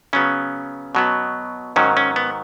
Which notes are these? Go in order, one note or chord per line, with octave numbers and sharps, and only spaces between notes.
C#3 F#3 B3 C#4
B2 F#3 B3
G#2 D#3 F#3 C#4
C#4
B3